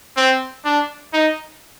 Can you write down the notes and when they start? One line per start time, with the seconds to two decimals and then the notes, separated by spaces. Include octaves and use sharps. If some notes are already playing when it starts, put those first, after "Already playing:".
0.17 C4
0.65 D4
1.13 D#4